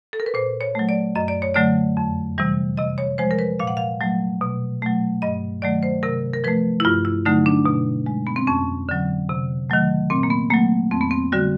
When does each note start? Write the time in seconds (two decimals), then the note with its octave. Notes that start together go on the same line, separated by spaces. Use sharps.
0.13 A4
0.20 A#4
0.26 B4
0.34 A#2 C5
0.61 C#5
0.75 F#3 A3
0.89 D5
1.15 F#2 D#5
1.28 D5
1.42 C#5
1.54 D3 F#3 A3 D5
1.97 F2
2.38 C3 E3 G3
2.77 C3 D#5
2.98 C#5
3.18 F3 G#3 C5
3.31 A#4
3.39 B4
3.60 A#2 F5
3.67 F#5
3.77 F5
4.01 F#3 A3
4.41 B2
4.82 F#3 A3
5.22 G2 D#5
5.62 D#3 F#3 A3 D5
5.83 C5
6.03 C3 A#4
6.33 A#4
6.44 F3 A3 B4
6.80 E4
6.85 G2 F4
7.05 E4
7.25 D3 F#3 A3 D#4
7.46 D4
7.66 B2
8.06 G#3
8.27 B3
8.36 C4
8.47 F2 C#4
8.89 D3 F#3
9.29 C3
9.70 D#3 F#3 A3
10.10 A#2 C4
10.23 A#3
10.30 B3
10.50 F#3 A3 A#3
10.91 F2 C4
11.01 B3
11.11 C4
11.32 D3 G3 F#4